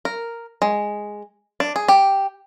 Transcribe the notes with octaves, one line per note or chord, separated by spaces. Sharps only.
A#4
G#3
D4
G#4
G4